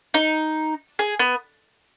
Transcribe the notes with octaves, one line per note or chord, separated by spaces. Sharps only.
D#4
G#4
B3